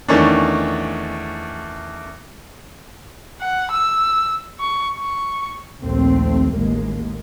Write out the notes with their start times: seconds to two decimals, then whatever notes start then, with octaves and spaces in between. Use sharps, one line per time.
0.08 E2 D#3 A3 C#4 D4
3.40 F#5
3.71 E6
4.59 C#6
4.99 C#6
5.80 A#1 D#2 A3 C4
6.53 A1 D#2 G#3 A#3